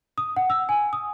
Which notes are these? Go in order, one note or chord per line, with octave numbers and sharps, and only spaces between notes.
D#6
F#5
E6
G#5
D#6